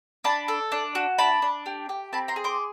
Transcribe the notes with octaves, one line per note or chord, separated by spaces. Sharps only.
D4 A5 B5
A4
D4
F#4
D4 A5 B5
D4
G4
G4
C4 A5 B5
A#5 C6
G#4
C6 D6